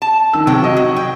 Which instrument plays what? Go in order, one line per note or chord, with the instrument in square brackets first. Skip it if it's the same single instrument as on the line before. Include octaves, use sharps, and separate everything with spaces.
[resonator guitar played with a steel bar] A5
[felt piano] D#3 E6
[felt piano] C3 [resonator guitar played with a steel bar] F#3 G5
[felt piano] F#4 D#5
[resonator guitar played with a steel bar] F#3
G5